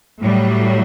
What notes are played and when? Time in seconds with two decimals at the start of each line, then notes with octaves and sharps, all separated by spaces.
0.20 A2 F#3 G3